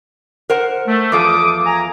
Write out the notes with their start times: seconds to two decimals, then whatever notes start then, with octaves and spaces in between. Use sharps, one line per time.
0.50 A#4 C5 F#5
0.87 A3
1.12 E2 F3 A4 D6 D#6
1.66 G#5 A#5